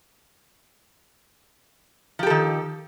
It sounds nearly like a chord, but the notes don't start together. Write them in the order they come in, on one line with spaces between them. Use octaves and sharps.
F3 G4 A4 D#3